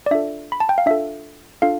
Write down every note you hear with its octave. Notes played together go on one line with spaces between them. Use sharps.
D5
D4 F4 A4 E5
B5
A5
G5
F5
D4 F4 A4 E5
D4 F4 A4 F5